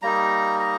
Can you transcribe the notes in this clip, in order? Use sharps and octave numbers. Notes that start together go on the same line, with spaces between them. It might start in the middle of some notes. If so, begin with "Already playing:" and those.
G3 A#3 D#4 A#5
A#5